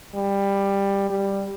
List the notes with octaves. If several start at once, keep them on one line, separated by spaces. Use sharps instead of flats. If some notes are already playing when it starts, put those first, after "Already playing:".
G3
G3